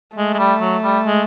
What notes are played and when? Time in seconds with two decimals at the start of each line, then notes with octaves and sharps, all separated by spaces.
0.17 G#3 A3
0.34 G#3
0.39 G3
0.61 F#3
0.84 G3
1.06 G#3